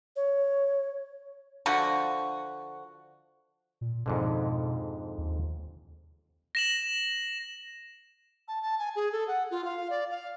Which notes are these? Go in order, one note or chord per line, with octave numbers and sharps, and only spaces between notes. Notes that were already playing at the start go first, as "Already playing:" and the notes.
C#5
D3 F3 F#4
A#2
F2 G#2 B2 D3
D#2
A#6 E7 F#7
A5
A5
G#5
G#4
A4
F#5
F4
F5
D5
F5